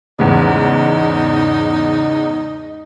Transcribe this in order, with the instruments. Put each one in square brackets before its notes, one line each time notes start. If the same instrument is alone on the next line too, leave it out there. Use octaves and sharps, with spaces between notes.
[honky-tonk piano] E2 G#2 C#3 [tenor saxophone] D#4